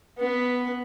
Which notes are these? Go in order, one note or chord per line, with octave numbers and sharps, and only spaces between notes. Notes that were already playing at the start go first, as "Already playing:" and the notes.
B3 B4